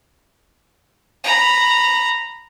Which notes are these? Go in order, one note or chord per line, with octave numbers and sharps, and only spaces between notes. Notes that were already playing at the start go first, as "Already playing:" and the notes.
A#5 B5